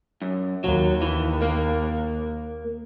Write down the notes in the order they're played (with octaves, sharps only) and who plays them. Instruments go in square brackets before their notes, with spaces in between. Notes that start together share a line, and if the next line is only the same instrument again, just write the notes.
[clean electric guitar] F#2
[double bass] D#2 [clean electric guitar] F#3
[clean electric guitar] E3
A#3